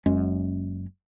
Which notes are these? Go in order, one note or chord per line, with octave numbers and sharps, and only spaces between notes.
F#1 F#2 G#3 C#4